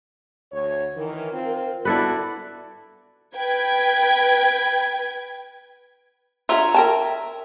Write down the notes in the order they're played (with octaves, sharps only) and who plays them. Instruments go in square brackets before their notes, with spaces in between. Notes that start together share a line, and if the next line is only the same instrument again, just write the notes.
[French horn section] D2 C#5
[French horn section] D#3 E3 [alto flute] A#4
[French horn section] C4 F4
[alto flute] B3 [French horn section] D4 F#4 D5 [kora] E4 A4 B4
[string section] B4 G5 G#6
[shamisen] D3 F4 [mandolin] C#5 E5 A#5
[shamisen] A#4 G5 A5